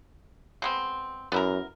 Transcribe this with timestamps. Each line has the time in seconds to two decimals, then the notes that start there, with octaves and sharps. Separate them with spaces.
0.62 G#3 B3 C4
1.32 F#2 B3 E4 A#4